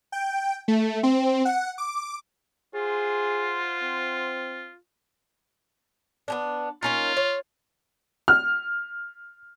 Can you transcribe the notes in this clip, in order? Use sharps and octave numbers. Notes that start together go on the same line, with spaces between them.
G5
A3
C4
F#5
D6
F4 G#4 C5 F#5 C6
C4
B3 C#4 D4
A#3 C#4 D#4 F4
C#5
F6